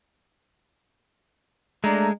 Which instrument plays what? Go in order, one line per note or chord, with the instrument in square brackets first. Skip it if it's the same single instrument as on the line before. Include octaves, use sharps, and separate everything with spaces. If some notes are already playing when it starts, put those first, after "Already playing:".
[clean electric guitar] G#3 [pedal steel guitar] A3 [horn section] D4 D5 A#5